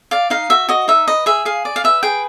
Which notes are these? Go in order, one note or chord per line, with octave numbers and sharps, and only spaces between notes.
D5 F5
D#4 F5
F#4 E5
F#4 D#5
D#4 E5
B4 D#5
G#4 E5
G#4 F5
D5
F5
B4 E5
G#4 G5